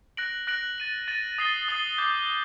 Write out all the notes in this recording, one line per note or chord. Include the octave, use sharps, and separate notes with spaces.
F#6 A#6 D7 F#7
F#6 A#6 D7 F#7
A6 D#7 F#7
A6 D#7 F#7
D#6 A6 C7 G7
D#6 A6 C7 G7
D6 G6 C7 G7